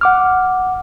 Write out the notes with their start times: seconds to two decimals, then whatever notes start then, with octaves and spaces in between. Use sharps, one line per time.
0.01 F#5 D6 F6